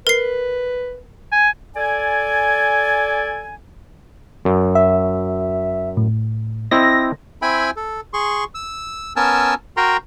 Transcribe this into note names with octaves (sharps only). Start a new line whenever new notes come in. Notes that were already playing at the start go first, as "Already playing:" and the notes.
A#4 B4 C7
G#5
A4 D5 G#5
F#2
E5
A2
C4 E4 D#5 A#6
C4 E4 E5 G5 G#5 B5
A4
G#4 C6 C#6
E6
B3 C#4 A#4 G#5 A5 E6
F#4 A#4 G5 A#5 C6